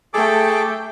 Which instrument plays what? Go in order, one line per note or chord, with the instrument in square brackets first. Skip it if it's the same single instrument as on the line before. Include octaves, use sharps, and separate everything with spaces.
[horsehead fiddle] A3 G5 [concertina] G#4 A4 D6